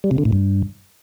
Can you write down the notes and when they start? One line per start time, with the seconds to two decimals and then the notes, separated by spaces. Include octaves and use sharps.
0.04 G3
0.11 C3
0.18 D3
0.25 A2
0.32 G2